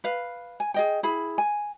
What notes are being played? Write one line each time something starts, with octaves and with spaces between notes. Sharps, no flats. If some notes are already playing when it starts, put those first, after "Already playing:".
B4 F5
G#5
G#4 D#5 G5
E4 G#4 B5
G#5